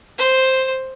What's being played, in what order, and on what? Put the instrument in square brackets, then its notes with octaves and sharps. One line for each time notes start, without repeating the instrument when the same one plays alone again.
[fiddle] C5